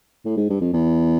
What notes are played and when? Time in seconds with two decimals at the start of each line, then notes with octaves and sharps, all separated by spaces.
0.25 A2
0.37 G#2
0.49 G2
0.61 F2
0.73 E2